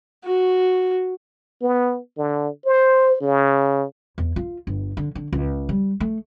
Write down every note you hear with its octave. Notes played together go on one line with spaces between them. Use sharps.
F#4
B3
D3
C5
C#3
E2
F4
G1
D3
D3
C#2
G3
A3